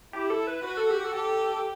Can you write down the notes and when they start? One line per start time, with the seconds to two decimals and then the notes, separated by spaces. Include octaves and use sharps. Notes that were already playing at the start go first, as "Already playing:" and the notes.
0.13 E4 G4
0.30 A4
0.47 B4
0.64 F#4 B4
0.77 A4
0.90 G4
1.04 A4
1.15 G4